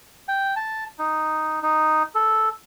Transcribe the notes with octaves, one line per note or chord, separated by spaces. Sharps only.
G5
A5
D#4
D#4
A4